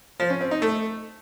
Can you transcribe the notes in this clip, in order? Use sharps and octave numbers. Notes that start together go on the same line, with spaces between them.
F3
C#4
C4
D#4
A3